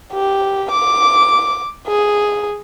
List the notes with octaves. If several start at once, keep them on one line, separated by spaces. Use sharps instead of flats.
G4
D6
G#4